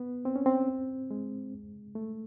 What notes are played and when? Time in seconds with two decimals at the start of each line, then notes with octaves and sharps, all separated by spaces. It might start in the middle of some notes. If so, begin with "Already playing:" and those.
Already playing: B3
0.25 C4
0.36 C#4
0.46 C4
1.11 G#3
1.95 A3